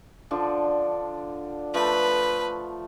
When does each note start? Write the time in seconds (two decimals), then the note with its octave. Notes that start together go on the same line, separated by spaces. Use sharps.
0.31 D3 F3 D4
1.74 F3 A3 B4